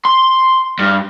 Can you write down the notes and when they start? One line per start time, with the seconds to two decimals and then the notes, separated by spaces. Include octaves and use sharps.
0.05 C6
0.79 G2